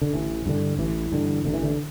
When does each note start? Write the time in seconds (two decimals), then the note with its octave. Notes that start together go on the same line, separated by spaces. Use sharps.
0.02 D3
0.13 A1 E3
0.46 G2 D3
0.79 A1 E3
1.12 G2 D3
1.45 A1 D3
1.54 E3
1.62 D3